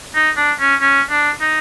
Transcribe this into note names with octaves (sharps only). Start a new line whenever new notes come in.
D#4
D4
C#4
C#4
D4
D#4